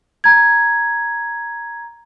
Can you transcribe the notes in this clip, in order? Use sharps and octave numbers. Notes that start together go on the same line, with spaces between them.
A#5 G#6